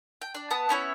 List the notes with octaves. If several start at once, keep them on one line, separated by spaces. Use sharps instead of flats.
G5
D4 D5
B3 B4 A5 D#6
B3 C#4 E4 C#5